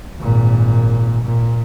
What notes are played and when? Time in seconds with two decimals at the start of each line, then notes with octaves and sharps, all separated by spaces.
0.21 G#1 A#2
1.24 A#2